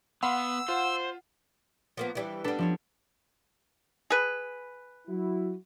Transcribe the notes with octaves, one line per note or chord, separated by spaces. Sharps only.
B3 F5 F#5 B5 C6 E6
F4 C5
F3 A#3 B3
E3 G3 D4
G3 B3 D4 A4
F3 D4 C#5
G#4 B4
F#3 E4 F#4